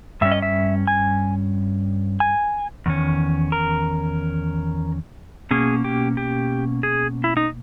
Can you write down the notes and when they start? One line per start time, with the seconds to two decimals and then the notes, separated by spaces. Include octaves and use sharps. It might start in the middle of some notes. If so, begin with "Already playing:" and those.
0.21 G2 G3 C#4 E5
0.32 D#5
0.42 E5
0.87 G#5
2.20 G#5
2.86 E2 D#3 C#4
3.52 A#4
5.51 B2 A#3 C#4 G#4
5.84 G4
6.17 G4
6.83 G#4
7.24 E4
7.37 D#4